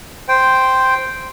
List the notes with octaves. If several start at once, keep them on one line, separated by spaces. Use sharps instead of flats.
C5 G5